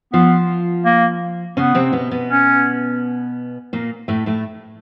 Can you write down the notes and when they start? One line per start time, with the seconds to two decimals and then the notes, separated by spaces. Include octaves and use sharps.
0.13 F3 B3 F4
0.85 A#3
1.57 C#3 B3 C#4
1.75 C3 C4
1.93 B2 B3
2.11 B2 B3
2.29 C#4
3.73 A#2 A#3
4.08 A2 A3
4.26 A2 A3